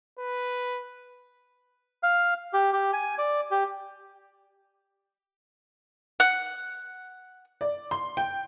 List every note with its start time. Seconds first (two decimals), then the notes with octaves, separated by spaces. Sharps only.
0.19 B4
2.03 F5
2.53 G4
2.73 G4
2.93 G#5
3.18 D5
3.51 G4
6.20 F#5
7.61 D5
7.91 C6
8.17 G5